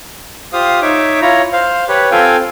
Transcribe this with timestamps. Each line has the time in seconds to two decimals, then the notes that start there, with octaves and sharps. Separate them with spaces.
0.53 F4 G4 C5 F5 D#6
0.82 D#4 C#5 E5 D6
1.22 E4 F4 C#5 A#5
1.53 C5 F5
1.88 G4 B4 C#5
2.11 C4 F4 A4 F5 G5 G#5